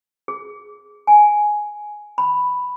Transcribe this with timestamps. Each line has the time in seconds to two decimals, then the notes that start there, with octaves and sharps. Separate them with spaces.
0.28 G#4
1.07 G#5
2.18 B5